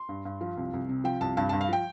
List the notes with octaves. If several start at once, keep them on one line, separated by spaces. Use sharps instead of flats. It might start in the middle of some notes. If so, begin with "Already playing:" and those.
Already playing: C6
G2
G2
F3
C2
C2
C3
F3 G5
C2 A5
G2 A5
A5
G2
F5
F3 G5